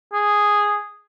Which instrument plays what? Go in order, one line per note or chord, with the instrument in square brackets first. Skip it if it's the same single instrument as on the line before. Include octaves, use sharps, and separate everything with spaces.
[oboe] G#4